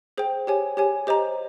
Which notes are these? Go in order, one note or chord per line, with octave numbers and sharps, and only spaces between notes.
G#4 C5 G5
G4 C#5 G#5
G4 C#5 G#5
G4 C5 D#5 A#5